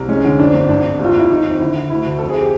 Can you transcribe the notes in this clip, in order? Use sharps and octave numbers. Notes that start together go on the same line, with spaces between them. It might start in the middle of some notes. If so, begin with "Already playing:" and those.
Already playing: C2
G#3 C#4
D3
F2 D4
G1
G#1 D4
G#1
D#2
F4
D#2 E4
D#3 D#4
F2
D3 E4
D3
D2 E4
D2
F2 A4
G#4
G4